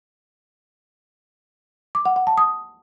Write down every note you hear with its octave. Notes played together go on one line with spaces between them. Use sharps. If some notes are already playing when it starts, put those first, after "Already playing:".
D6
F#5
F#5
A5
D#6